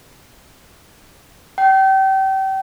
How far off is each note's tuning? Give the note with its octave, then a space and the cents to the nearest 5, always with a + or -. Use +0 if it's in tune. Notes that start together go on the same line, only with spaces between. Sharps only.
G5 -30